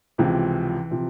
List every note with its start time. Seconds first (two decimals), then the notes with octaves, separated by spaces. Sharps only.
0.18 C#2 C3 E3 F3
0.91 C3 F3